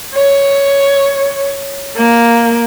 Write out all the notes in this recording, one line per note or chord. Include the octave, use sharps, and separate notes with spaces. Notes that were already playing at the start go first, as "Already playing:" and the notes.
C#5
A#3